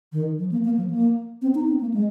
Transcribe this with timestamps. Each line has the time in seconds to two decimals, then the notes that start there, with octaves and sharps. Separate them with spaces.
0.12 D#3
0.39 F3
0.52 A#3
0.64 A#3
0.77 F3
0.90 A#3
1.42 C4
1.55 D#4
1.68 C4
1.81 A#3
1.94 G#3